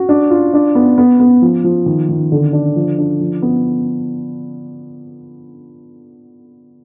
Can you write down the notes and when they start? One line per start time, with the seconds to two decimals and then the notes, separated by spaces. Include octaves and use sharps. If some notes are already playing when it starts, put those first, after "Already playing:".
Already playing: F#4
0.09 D4
0.31 F4
0.54 D4
0.75 B3
0.98 B3
1.20 B3
1.42 F3
1.64 F3
1.86 D#3
2.09 D#3
2.32 D3
2.53 D4
2.76 F3
2.98 D4
3.21 F3
3.42 B3